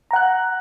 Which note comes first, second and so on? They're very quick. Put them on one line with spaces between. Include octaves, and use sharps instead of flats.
A#5 F#5 F#6